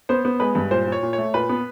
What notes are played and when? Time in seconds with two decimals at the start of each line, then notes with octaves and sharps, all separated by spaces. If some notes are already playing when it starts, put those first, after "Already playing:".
0.09 B3 C5
0.25 B3
0.40 G#3 B4
0.55 G2
0.71 A#2 C5
0.87 A#2
0.92 C#5
1.02 A#2
1.13 C#5
1.18 A3
1.34 A#2 B4
1.49 B3